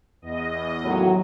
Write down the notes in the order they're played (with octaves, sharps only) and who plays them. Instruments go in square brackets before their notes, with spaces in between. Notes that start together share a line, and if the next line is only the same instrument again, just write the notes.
[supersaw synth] E2 D#5
[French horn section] D#2 A2 F#3